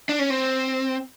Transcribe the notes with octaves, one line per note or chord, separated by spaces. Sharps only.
D4
C#4
C4